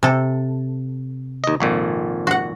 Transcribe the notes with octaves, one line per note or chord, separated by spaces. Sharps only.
C3 A4
D#2 D#5
G#1 F2 A#2
F#4 F#5